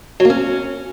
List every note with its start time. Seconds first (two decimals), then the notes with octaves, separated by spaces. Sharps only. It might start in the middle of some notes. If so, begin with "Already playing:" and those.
0.20 F#3
0.25 A#3
0.30 C#4